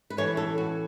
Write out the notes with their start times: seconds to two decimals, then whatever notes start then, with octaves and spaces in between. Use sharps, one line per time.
0.10 B4
0.17 A2 E3 A3 C#4 C#5
0.37 A4
0.58 F#4